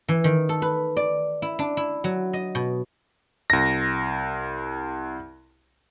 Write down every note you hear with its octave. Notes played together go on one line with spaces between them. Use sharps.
E3
D#3
A4
B4
D5
E4
D4
E4
F#3
D#5
B2
C2 A#6